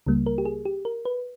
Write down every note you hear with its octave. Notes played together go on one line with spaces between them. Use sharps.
C#2 C#3 G3 A#3
A#4
G4
G#4
G4
A#4
B4